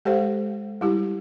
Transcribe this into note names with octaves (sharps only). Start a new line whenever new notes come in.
G#3 G4 A4 C5 F5
G3 E4 G4